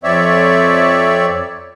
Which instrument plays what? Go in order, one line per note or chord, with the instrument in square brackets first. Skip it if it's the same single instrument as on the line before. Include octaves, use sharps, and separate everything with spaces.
[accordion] F2 C4 C#5 D5 E5